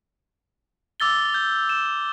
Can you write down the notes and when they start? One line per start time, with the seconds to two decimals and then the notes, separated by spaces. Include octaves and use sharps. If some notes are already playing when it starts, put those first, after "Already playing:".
1.00 D6 E6 A6 G7
1.34 G6
1.69 E7